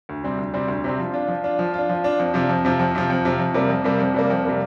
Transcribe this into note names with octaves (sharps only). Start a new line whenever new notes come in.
D2
C3 G3 C4
D2
C3 G3 C4
D2
C3 G3 C4
F3
D4 F4
F3
D4 F4
F3
D4 F4
F3
D4 F4
F2
C3 F3
F2
C3 F3
F2
C3 F3
F2
C3 F3
F2
C3 G3 A#3
F2
C3 G3 A#3
F2
C3 G3 A#3
F2
C3 G3 A#3